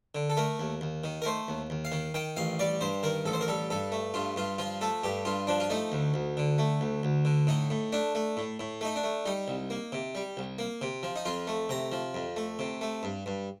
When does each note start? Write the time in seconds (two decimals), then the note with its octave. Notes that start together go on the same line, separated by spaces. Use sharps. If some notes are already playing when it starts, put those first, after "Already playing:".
0.15 D3
0.30 A4
0.37 A3 A#4
0.60 D#2
0.81 D#2
1.04 D#3
1.22 A#4
1.25 A3 C5
1.48 D#2
1.70 D#2
1.85 F5
1.92 D#3
2.14 D#3 G5
2.37 A1 F5
2.59 G3 D5
2.81 G2 C5
3.03 D#3 A#4
3.25 A1 A4
3.33 C5
3.41 A#4
3.48 G3 A4
3.70 G2 A4
3.92 A3
4.14 G2 F4
4.36 G2 F4
4.58 F3 F4
4.81 A3 A4
5.03 G2 G4
5.25 G2 F4
5.47 F3 D4
5.60 F4
5.70 A3 D#4
5.92 D2
6.14 D2
6.37 D3
6.58 A3
6.81 D2
7.03 D2
7.25 D3
7.47 A2 D#4
7.70 A2
7.93 A3 D4
8.15 A3
8.37 A2
8.60 A2
8.81 A3 D#4
8.96 D4
9.04 A3
9.26 G3 D#4
9.48 C2
9.70 A#3
9.92 C3
10.15 G3
10.37 C2
10.59 A#3
10.81 C3
11.03 F3
11.16 D#4
11.26 F2 F4
11.47 A3
11.69 C3 A#5
11.92 F3
12.14 F2
12.36 A3
12.59 C3
12.81 A3
13.03 G2
13.26 G2